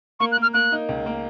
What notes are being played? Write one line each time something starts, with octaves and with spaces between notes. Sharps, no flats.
A#3 C#6
F#6
A#3 F6
A#3 F#6
D#4
C#2
A#3